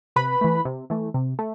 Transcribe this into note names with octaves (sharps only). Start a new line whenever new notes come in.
C3 B4 B5
E3 A3
C3
E3 A3
C3
A3